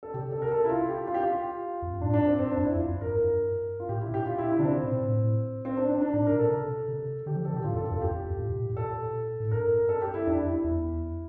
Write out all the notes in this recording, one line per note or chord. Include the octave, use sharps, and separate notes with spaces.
A4
C3 G4
A4
A#4
A4
E4
F4
G4
F4
G4
F4
F2
G2
A2 D4
D4
C4
G2 C4
D4
F2
E4
F2 F4
F2
G2 A#4
G2
F4
A2 G4
E4
A#2
G4
F4
E4
E4
D3 D4
C3 C4
A#2
A2
C4
D4
D4
D4
A2 D4
A#4
A#2
A4
C3
C3
D3 G4
F3
D3 A4
C3
G4
A2 F4
F2 A4
G2
F2 A4
F4
E2 G4
F2
E2
F2
A2
A#2
A2
A#2 A4
A2
G2 A#4
A4
G4
E4
F2 D4
E4
E4
E2